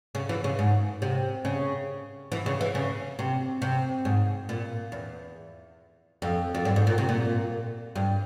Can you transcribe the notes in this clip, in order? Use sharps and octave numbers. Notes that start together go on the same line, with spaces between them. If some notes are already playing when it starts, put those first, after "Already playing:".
C#3
E3
C#3
G#2
C3
C#3
E3
C#3
E3
C#3
C3
C3
G#2
A#2
E2
F2
F2
G2
G#2
A#2
C3
A#2
G2